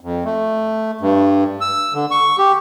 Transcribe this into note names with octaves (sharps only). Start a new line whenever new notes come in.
F2
A3
G2
E6
D3
C#6
G4